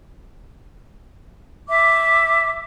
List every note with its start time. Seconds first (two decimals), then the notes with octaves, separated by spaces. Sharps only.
1.68 E5 D6